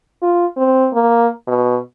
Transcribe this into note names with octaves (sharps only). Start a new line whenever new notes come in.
F4
C4
A#3
B2